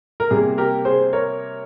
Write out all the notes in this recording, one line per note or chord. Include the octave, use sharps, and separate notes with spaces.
A#4
C3 G3 A#3 G#4
G4 A#4
G#4 C5
A#4 C#5